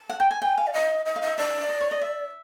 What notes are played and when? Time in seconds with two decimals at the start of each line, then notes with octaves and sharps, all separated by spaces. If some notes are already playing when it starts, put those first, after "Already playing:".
Already playing: A5
0.10 F#5
0.20 G5
0.31 G#5
0.41 G5 G#5
0.58 F5
0.67 D5
0.73 D#5
1.05 D#5
1.16 F5
1.22 D#5
1.27 E5
1.38 D5 E5
1.69 D#5
1.81 C#5
1.91 D#5
2.01 E5